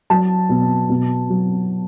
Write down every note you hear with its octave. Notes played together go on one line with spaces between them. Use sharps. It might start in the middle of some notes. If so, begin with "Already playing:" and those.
F#3 A5
B2
B2
F#3